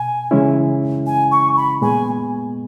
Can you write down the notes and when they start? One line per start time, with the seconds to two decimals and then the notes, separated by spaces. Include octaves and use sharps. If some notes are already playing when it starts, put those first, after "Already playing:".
Already playing: B2 G#5
0.31 C#3 E3 G#3 C#4 E4
1.07 G#5
1.32 C#6
1.57 B5
1.82 A#2 G#3 B3 G#5